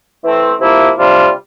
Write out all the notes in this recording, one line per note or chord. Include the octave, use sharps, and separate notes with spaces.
E3 A3 C4
C3 F3 A#3 E4
C3 G3 D4 F4